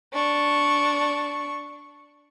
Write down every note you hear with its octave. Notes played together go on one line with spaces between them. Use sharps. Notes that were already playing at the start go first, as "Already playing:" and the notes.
D4 C#6